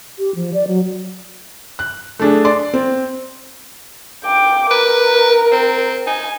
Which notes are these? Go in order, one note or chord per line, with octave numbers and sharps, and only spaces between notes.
G4
F3
D5
F#3
F#6
A3 D4 G#4
D5 C6
C4
G5 D6
A#4 B4
C4
D#4 G#5